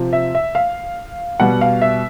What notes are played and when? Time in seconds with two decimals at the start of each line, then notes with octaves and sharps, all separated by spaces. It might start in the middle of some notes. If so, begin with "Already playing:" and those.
Already playing: C3 F3
0.13 E5
0.35 E5
0.55 F5
1.40 B2 G3 F#5
1.61 F5
1.82 E5